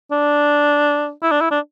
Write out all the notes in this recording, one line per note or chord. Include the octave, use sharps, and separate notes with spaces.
D4
E4
D4
E4
D4